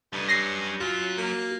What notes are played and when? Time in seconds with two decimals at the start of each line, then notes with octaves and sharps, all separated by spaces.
0.13 G2 A3 D#4
0.28 F#3 C#4 A#6 C7
0.80 F#2 F#3 F4 F#4
1.18 A#3